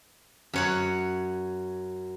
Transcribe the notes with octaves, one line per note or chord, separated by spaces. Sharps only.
F#2 C#5 F#5